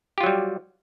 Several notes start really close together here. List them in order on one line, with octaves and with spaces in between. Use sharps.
G4 F4 F#3 G3